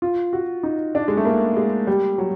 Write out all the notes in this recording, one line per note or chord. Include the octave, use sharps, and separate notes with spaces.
F4
F#4
D#4
D4
G#3
A3
A#3
G#3
G3
F#3